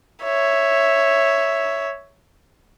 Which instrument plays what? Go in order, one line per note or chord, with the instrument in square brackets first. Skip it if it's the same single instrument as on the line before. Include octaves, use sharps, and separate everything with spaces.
[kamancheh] C#5 E5